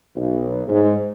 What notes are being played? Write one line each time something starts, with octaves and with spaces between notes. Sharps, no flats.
B1
G#2